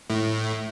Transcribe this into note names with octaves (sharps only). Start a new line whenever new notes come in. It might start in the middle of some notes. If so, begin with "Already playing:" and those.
A2